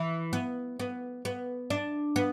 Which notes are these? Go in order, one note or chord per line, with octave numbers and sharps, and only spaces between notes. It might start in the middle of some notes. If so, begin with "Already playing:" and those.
Already playing: E3
B3
B3
B3
D4
B3